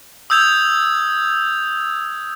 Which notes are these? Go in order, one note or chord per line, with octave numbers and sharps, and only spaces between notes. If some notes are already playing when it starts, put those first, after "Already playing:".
D#6 E6 G6 G#6 F7